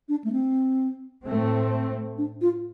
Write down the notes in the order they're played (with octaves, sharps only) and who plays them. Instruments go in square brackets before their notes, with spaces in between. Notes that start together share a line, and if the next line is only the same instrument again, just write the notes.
[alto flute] D4
A3
C4
[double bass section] A2 A3 C4
[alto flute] D4
F4